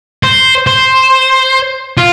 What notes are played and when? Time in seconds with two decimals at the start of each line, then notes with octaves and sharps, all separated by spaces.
0.23 C5
0.67 C5
1.97 F4